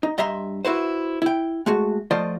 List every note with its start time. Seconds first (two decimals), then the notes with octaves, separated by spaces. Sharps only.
0.03 D#4
0.18 G2 D#5 E5 A#5 C6
0.65 E4 F#4 B4 C5
1.22 E4 G5
1.66 G#3 A3 F#4
2.11 F3 A3 F4 C5 D5 D#5